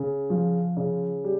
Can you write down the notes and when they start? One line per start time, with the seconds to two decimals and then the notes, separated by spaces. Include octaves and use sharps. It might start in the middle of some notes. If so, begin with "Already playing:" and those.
Already playing: C#3
0.30 F3
0.77 C#3
1.24 G3